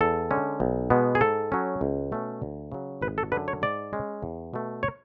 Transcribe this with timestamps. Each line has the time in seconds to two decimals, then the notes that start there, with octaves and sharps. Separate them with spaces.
0.01 E2 A4
0.31 D3 G#3 C#4
0.60 B1
0.90 B2 G#3 B3
1.15 G#4
1.21 G#2 A4
1.52 F#3 C#4
1.81 C#2
2.12 B2 A3 C#4
2.42 D2
2.72 C#3 F#3
3.02 G#1 B4
3.18 A4
3.32 F#2 D3 B4
3.48 C#5
3.62 G#2 D5
3.93 G#3 C#4
4.22 E2
4.54 B2 A3
4.83 C#5